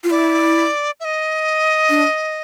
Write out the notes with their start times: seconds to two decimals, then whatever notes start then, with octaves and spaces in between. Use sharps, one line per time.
0.04 F4
0.10 E4 D5
1.00 E5
1.05 D#5
1.89 D4